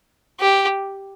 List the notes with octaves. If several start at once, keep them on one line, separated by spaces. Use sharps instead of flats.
G4